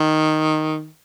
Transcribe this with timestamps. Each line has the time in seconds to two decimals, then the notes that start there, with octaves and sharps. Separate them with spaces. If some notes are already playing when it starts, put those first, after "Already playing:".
Already playing: D#3